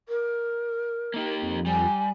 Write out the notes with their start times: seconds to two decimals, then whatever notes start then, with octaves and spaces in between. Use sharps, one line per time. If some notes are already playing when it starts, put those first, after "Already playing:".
0.08 A#4
1.14 A#3 D#4 G4
1.43 F2
1.66 G3 G#5